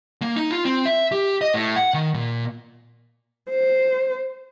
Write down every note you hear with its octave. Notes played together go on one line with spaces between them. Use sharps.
A#3
D#4
F4
C4
E5
G4
D#5
A2
F#5
D#3
A#2
C5